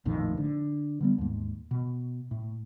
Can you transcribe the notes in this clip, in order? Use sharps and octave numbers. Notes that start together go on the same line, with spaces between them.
A#1 F2 A2 D#3
D3
D3 G3 B3
D#2 G#2
B2
A2